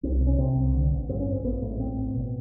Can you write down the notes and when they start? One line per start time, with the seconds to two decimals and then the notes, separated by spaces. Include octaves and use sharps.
0.03 C2 C4
0.21 C3
0.27 C#4
0.38 C3 C4
0.56 C2
0.74 D3
0.91 A1
1.09 G2 C4
1.20 C#4
1.26 A1
1.32 C4
1.43 A1 B3
1.61 A2 A3
1.71 G#3
1.80 A2 C4
1.97 A1
2.14 B2